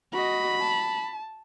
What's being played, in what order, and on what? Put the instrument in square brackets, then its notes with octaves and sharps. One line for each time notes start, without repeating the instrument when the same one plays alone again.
[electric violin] F#4 D#5 [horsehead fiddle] B5
[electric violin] A5